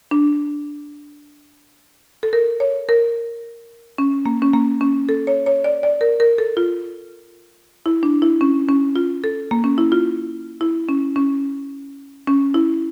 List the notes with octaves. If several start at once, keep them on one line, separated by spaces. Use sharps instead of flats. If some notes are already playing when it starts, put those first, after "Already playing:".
D4
A4
A#4
C#5
A#4
C#4
A#3
C#4
A#3
C#4
A4
C#5
C#5
D5
D5
A#4
A#4
A4
F4
E4
D4
E4
C#4
C#4
F4
A4
A#3
C#4
E4
F4
E4
C#4
C#4
C#4
E4